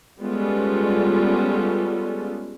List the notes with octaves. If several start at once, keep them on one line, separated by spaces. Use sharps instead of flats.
G3 G#3 B3 C#4 F4 A4